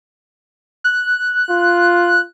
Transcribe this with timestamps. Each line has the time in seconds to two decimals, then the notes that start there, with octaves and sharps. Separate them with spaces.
0.84 F#6
1.49 F4